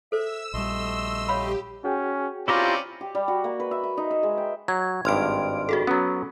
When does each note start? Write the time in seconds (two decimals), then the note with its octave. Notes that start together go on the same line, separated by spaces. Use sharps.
0.12 A4 C5 E5 E6
0.54 A#1 G3 A3 D#5 C6
1.28 G4 C#5 F5 B5
1.84 C#4 F#4 G#4 G5
2.48 C4 C#4 E4 F4 G4 D5 A#5
3.01 G4
3.15 G3
3.28 F#4
3.44 A#3
3.60 B4
3.71 E5
3.84 E5
3.97 D#4
4.11 E5
4.23 G#3
4.38 G5
4.68 F#3 G#6
5.05 G#1 G2 C6 F6 D7
5.69 F#4 G#4 A4
5.87 F#3 B3 C#4